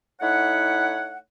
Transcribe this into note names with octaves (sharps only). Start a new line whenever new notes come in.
A3 D#4 E4 C#5 F#5